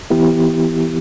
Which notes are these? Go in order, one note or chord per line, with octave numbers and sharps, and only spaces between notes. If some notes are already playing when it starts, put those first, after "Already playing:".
E3 B3 E4 G4